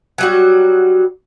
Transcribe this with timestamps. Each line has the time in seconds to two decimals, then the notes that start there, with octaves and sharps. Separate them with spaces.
0.18 F#3 G3 F#4